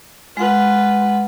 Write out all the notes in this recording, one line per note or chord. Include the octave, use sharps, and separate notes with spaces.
G#3 F4 B4 F#5